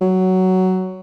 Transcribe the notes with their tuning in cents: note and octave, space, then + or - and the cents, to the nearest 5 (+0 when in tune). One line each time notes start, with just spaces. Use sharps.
F#3 +10